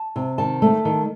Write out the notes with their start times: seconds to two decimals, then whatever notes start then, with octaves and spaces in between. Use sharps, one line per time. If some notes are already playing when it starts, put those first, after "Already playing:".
Already playing: A5
0.16 C3
0.38 D#3 A5
0.62 A3
0.85 D#3